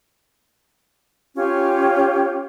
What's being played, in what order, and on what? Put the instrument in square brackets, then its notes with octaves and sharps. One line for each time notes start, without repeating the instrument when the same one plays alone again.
[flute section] C#4 F4 G4 C#5